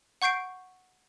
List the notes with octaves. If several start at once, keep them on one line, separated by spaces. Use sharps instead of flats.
F#5 C#6 G6 C7 D7